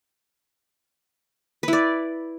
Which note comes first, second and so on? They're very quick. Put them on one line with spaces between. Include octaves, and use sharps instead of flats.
B4 E4 D5